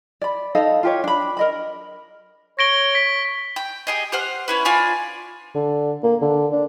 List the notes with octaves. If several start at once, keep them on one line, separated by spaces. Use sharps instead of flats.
D5 B5
D#4 A4 D#5 F5
F4 G4 C#5
D4 B5
A#4 D#5 B5
C#5 A#6 D7 G7
B6
G5
G4 G#4 D#5
G4 C5 F#5 F6
C#4 E4 B4
D4 F4 G#5 B5
D3
A#3
D3
D4